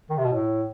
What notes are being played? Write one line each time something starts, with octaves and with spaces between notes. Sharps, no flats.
D#3
C3
B2
A2